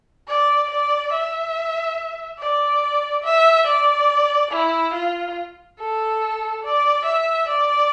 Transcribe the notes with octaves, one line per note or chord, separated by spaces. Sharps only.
D5
D5
E5
D5
E5
D5
E4
F4
A4
D5
E5
D5